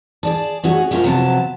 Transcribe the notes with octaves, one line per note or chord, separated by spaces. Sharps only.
G#4 D5 A5
A3 C#4 F#4 G#4
A3 C#4 F4 A#4 C5
C3 F3 F#3 B3 C#5 A5